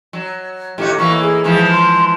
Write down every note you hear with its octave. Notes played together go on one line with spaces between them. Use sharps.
F#3
A2 D#3 F#4 G4
A2 E3 A#3 C#6
G#4
G#2 E3 F3
C6